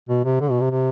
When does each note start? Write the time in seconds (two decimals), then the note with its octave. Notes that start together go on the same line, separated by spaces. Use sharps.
0.09 B2
0.25 C3
0.41 D3
0.51 B2
0.61 C3
0.71 C3